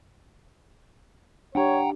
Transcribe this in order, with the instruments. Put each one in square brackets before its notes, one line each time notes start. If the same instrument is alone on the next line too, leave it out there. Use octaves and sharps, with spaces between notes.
[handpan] D4 G4 [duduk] C#5 [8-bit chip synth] F#5 G5 A#5